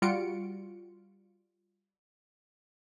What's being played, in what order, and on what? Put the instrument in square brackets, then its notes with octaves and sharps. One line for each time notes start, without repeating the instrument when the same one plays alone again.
[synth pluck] G3 F4 F#4 C#7 D7